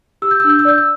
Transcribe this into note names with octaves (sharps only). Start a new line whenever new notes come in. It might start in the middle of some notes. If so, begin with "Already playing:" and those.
G4 E6
G6
E6
D4
G6
E6
D5 G6
E6